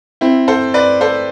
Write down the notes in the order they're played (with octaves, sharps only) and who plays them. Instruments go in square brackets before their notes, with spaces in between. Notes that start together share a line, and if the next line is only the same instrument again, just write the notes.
[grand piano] C4 E4
A4 C5
B4 D5
A4 C5